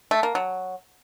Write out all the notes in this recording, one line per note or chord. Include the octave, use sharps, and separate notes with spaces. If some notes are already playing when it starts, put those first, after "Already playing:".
A3
A#3
F#3